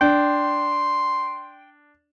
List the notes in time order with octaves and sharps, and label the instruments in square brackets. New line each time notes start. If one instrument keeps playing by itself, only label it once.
[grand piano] D4 [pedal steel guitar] G5 [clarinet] C6